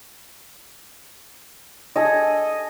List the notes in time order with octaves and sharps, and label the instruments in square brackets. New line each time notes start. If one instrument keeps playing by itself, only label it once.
[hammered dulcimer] G#4 A4 D#5